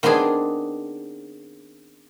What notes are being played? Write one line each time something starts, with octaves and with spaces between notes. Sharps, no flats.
D#3 B3 C4 D4 G#4